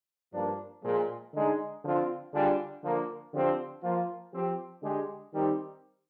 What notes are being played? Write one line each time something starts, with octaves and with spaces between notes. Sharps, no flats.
G2 F3 A#3 D4
A#2 F3 G#3
D3 G#3 D#4 G#4
D3 F3 C4 F4
D3 G3 D4 F4 G#4
D3 F3 A#3
D3 F3 C4 G4 C5
F3 A#3 F4
F3 C4 G4
D3 G#3 D4 G4
D#3 G3 C4 D#4 G4